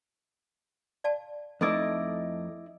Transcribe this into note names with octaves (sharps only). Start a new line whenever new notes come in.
D5 F5 A5
F2 A3 D#4 E4 B4 D5 D#5